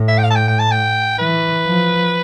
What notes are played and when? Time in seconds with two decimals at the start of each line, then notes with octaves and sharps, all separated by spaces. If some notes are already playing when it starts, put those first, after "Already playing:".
Already playing: A2
0.08 E5
0.18 G5
0.24 F5
0.30 A5
0.36 G5
0.48 G5
0.59 A5
0.71 G5
1.18 E3 B4
1.66 F3